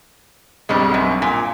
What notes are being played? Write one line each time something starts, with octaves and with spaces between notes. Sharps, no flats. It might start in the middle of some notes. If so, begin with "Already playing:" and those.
B1 G2 G3 G#3 C4
F#2
A#2 G#5 D6